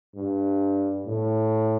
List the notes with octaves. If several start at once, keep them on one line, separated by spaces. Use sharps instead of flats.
G2
A2